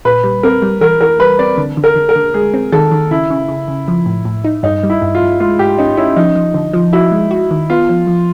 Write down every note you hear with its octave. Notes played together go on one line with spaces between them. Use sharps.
A#2 B4
G3
C4 A#4
G3
E3 A#4
E3 A#4
G3 B4
C4 D5
D3
D3
A#4
D3
A#4
D3
G#3 G#4
C4
D#3 A4
D#3
C#3 E4
C#3
C#3
C#3
F3
A2
A2
D#4
G2 D#4
G3
E4
G2
F4
G2
G#3 F4
G#2 G4
C#4 D#4
C#4 E4
F3 D#4
F3
D3
F3
E4 F#4
G#3
F#4
D#3
B3 F4
F3
F3